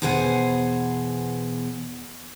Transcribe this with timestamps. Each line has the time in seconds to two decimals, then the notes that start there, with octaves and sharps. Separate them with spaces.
0.02 E2 B2 G#4 C5 F#5 G#5